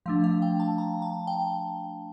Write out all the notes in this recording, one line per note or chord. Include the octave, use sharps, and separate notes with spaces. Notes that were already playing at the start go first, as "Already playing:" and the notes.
F3 A3 D4 F5
F5
G5
A5
A#5
A5
G5